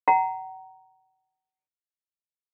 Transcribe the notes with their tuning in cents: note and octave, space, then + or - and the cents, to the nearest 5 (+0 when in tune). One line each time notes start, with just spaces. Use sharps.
F#5 +40 A#5 +0